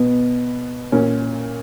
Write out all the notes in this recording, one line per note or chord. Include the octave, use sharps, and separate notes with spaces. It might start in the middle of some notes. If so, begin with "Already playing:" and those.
Already playing: B2 B3
A#2 C#4